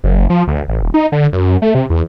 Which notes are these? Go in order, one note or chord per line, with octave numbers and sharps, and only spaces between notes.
F#1
F3
D2
A1
D#1
D#4
D3
F#2
A3
C3
E2